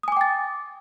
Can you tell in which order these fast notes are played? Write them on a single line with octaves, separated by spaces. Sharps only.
D#6 G#5 D6 G5 A6